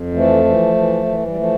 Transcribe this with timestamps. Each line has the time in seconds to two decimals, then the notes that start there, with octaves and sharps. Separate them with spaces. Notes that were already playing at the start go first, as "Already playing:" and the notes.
Already playing: F2
0.13 E3 F3 A3
0.44 E3
0.75 E3
1.06 E3
1.19 F3
1.28 G3
1.36 F3 A3